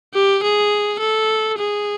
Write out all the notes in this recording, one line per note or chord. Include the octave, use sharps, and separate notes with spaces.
G4
G#4
A4
G#4